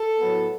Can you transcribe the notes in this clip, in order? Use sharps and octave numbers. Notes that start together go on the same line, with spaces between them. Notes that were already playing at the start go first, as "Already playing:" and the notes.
Already playing: A4
A2 F#3 B3